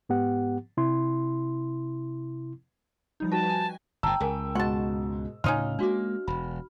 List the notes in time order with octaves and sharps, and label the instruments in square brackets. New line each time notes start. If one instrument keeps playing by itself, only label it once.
[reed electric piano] G#2 B3 G4 F#5
C3 E4 C6
[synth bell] F3 G3 D#4
[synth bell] F#4 B4 G5 [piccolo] A5
[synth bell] G#5
[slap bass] G1 A2 [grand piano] G5 E6 [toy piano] A5 A#5
[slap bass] C#2 [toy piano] G#4 A#4 G#5
[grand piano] G#2 B2 [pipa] F#5 A5 [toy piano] C6 C#6
[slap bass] D2 A2 C#3 [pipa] C#4 D#4 F4 [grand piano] F6
[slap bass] G#3 A#3 [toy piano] D4 F#4 D6
[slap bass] E1 [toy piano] B5